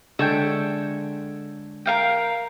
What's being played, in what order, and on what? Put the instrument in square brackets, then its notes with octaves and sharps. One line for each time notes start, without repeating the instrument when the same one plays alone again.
[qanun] D3 G#3 E5 [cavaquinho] A4 C#5 G5
[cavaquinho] A#4 F5 G5